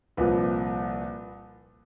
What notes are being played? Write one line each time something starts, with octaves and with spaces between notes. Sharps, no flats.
C2 A#2 F3 B4